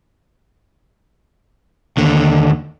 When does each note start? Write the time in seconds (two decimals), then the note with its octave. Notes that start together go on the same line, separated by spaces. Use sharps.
1.97 D#2 D3